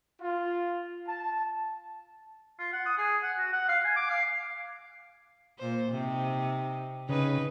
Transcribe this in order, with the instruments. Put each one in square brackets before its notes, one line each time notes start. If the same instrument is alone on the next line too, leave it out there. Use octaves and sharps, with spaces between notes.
[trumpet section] F4
A5
[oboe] F4
F#5
D#6
G#4
F#5
F#4
F#5
F5
G#5
D6
F5
[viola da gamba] A#2 C5
C3 D#4
[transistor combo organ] C#3 [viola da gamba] D#4 B4